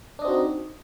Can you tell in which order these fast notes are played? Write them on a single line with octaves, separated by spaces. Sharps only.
D4 D#5 C4 F#4 D#4